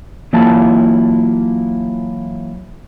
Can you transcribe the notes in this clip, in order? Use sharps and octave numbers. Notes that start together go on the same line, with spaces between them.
E3 F#3 A#3 E4 F4 A5